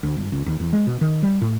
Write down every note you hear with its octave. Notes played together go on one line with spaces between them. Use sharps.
D2
G1
C#2
D#2
E2
G#3
B2
D#3
G3
A2